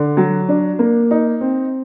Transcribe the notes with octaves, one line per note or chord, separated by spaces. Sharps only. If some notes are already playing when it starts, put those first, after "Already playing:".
Already playing: D3
F#3
D4
A#3
D#4
C4